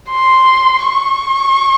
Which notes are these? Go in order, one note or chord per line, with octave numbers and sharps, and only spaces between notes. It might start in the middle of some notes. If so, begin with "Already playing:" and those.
C6
C#6